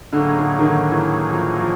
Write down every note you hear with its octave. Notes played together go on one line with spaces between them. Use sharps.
A2 D3 F#3 A#3 D#4 G#4
D3
D#3
D3
E3
F3
F3